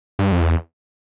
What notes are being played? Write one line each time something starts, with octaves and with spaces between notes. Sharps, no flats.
G2
F2
E2